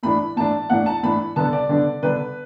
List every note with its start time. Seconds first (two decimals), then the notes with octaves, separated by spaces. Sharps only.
0.03 A2 E3 D4 B5
0.36 A2 E3 D4 A5
0.70 A2 E3 D4 F#5
0.86 A5
1.03 A2 E3 D4 B5
1.36 D3 B3 D4 A5
1.53 D5
1.69 D3 B3 D4
2.03 D3 B3 D4 B4